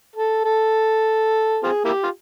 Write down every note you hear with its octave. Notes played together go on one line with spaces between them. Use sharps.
A4
A4
C4 F4 G#4
A#3 E4 G4
F4